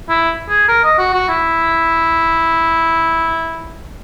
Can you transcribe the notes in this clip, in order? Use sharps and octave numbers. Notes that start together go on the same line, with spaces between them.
E4
G#4
A#4
D#5
F#4
F#4
E4